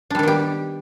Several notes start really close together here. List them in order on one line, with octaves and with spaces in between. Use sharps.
D4 G3 D#3 B3 G4